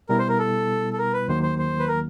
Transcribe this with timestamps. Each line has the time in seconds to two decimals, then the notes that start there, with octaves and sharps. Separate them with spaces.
0.09 B2 G3 B3 E4 A#4
0.19 C5
0.29 A#4
0.39 A4
0.93 A4
0.98 A#4
1.13 B4
1.28 D#2 D#3 F#3 A#3 C5
1.43 C5
1.58 C5
1.79 B4
1.88 A#4